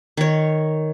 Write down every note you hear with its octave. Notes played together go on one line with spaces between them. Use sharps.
D#3 C#5